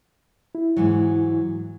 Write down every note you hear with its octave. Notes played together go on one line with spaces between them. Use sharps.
E4
G#2 E3 F#3